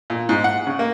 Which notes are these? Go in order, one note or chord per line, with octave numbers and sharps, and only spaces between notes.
A#2
G#2
F#5
C#3
A#3